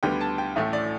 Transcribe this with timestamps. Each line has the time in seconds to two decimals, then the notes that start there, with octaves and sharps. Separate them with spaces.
0.03 D2 D3 G3 B3 G5
0.21 A5
0.38 G5
0.56 A1 A2 A3 E5
0.73 D5